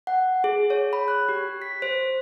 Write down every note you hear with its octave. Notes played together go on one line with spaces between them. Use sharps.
F#5
G#4
C#5
B5
F#6
G4
B6
C5